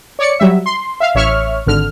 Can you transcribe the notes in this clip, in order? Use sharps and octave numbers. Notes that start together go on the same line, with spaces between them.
C#5 D5 C#7
F#3 G3 E5
C6
E5 F5
A1 C#5 E5 C#6 F6
G#1 D3 F6